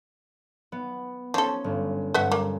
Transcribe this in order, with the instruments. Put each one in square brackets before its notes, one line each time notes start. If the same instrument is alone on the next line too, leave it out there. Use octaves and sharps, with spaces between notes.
[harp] B3
[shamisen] F3 A4 [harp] C#4
[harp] G1
[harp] G1 G2 [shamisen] B4 E5 F#5
[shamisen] A#3